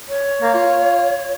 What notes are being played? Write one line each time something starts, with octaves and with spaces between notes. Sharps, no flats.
C#5
A#3
F4